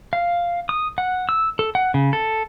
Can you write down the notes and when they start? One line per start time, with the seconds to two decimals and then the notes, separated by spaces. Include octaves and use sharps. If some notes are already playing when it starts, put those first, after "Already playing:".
0.13 F5
0.69 D#6
0.98 F#5
1.29 E6
1.59 A4
1.75 F#5
1.94 C#3
2.13 A4